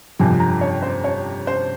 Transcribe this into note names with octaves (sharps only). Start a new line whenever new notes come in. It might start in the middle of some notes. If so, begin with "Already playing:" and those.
G1 F2 C3 F3 G#5
A#5
C#5
C5
C#5
C5